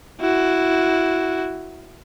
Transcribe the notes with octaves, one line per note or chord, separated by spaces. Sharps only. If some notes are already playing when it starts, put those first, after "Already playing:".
E4 F#4